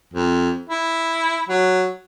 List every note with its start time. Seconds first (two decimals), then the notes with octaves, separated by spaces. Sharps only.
0.13 F2
0.70 E4
1.49 F#3